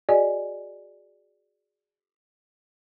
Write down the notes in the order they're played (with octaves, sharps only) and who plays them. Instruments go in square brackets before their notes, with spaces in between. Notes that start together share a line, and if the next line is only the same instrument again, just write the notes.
[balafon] F#4 G#4 D5 D#5 G#5